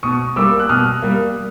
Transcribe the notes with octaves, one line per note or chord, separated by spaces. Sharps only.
B2 C#6 D#6
G3 A#3 D6 E6
F#6
B2 D#6 F6
G3 A#3